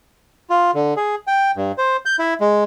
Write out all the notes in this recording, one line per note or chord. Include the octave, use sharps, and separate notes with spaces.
F4
D3
G#4
G5
G2
C5
G6
E4
G#3